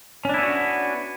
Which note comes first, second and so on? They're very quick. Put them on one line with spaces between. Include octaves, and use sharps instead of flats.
C#4 D4 E4 B3 F#4